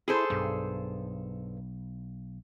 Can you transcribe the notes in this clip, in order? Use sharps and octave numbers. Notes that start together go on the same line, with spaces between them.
E4 G#4 A4 C5
B1 G2